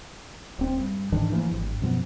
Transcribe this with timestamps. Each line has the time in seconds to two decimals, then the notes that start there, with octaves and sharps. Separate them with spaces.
0.59 D1 C4
0.80 G2
1.12 G#2 D#3 E3 D4
1.32 E3 F3 A3 A#3
1.51 G#1 G2
1.82 F#2 B2 F3 B3